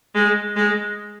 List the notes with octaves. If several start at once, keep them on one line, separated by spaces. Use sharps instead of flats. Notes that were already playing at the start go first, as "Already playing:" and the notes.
G#3
G#3